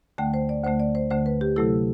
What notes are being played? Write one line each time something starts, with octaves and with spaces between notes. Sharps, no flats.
D2 D3 A3 G5
C5
D5
D2 D3 A3 C5
D5
C5
D2 D3 A3 C5
B4
G4
C3 F#3 A3 E4 A4